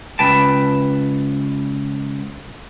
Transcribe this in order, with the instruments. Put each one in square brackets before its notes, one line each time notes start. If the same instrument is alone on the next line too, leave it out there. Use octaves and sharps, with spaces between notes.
[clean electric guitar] C#2 B4 G5 A5